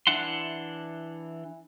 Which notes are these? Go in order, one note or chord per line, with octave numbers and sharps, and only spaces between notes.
E3 D4 E4 F#5 C6